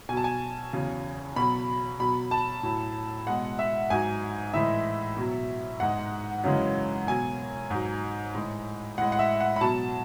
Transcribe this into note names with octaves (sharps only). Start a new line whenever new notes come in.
B2 F#3 G#5 A5
G#5
E2 C#3 F#3
B2 F#3 B5
B2 F#3 B5
A5
A2 F#3
B2 G#3 F#5
E5
G#2 F#3 G#5
A2 E3 G#3 E5
B2 F#3
G#2 G#3 F#5
F#2 C#3 E3 G#3
B2 F#3 G#5
G#2 F#3
A2 G#3
A2 G#3 F#5
F#5
E5
F#5
B5
B2 F#3 A5